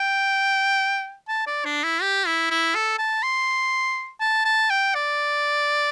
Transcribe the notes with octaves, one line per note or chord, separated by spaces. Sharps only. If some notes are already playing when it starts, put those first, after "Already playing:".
Already playing: G5
A5
D5
D4
E4
G4
E4
E4
A4
A5
C6
A5
A5
G5
D5